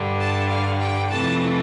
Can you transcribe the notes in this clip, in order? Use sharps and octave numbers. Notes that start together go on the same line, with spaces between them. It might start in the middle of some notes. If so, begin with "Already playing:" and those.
Already playing: G2 D3 G3
A5
F5
G5
F2 C3 E3 A3 A5